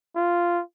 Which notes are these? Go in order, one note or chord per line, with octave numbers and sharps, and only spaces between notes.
F4